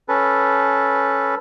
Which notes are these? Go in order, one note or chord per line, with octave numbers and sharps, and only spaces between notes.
C#4 A4 B4